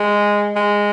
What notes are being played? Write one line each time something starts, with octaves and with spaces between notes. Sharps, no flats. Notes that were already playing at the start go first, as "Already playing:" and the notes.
Already playing: G#3
G#3